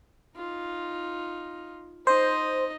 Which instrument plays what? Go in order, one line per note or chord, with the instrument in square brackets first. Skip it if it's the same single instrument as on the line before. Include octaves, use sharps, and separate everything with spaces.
[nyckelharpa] D#4 F4
[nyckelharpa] D#4 D#5 [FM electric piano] C5